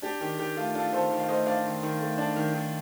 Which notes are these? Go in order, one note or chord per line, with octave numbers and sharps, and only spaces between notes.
D4 G4
D#3 G4
D#3 G4
A3 F4
D4 F4 A4
D#3 A4 C5
D#3
F5
A3 C5 D#5
D4 D5 F5
D#3
D#3
A3
D4
D#3
D#3